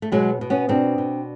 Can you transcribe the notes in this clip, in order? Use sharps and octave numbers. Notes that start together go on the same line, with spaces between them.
A3
B2 F#3 G#3
B2
B3 C#4
B2 C4 D4
B2